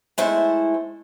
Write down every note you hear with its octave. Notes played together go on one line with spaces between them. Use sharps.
G#3 A3 E4 C5